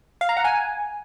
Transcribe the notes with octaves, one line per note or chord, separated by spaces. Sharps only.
F5
A#5
F#5
G#5